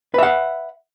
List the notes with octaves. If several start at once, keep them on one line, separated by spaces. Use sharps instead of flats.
B4 E5 F#5